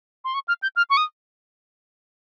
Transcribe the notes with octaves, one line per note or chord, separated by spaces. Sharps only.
C6
C#6
F6
G6
F6
C#6
D#6